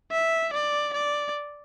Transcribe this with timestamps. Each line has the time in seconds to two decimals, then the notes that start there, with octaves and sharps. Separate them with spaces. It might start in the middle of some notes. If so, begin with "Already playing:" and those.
0.12 E5
0.53 D5
0.94 D5